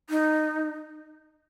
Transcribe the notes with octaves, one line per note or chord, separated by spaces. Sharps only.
D#4